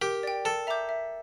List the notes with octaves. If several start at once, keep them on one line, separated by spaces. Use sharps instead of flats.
G4 A#4
D5 G5
A4 A#4
E5 A#5 D6 G6
E5